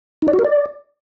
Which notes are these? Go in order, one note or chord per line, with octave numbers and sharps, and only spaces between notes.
D#4
D5
F#4
A#4
D5